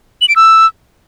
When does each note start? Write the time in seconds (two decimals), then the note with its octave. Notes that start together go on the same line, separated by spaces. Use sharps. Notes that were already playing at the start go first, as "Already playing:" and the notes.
0.21 F#7
0.29 D7
0.36 E6